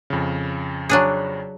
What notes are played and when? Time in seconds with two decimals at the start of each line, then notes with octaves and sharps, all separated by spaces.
0.10 F2 C#3
0.89 F#3 D4 G#4